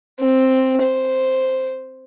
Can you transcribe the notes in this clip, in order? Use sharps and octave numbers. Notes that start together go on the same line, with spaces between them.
C4
C5